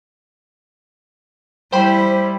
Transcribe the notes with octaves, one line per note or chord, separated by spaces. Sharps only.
G3 E4 C5 G5 B5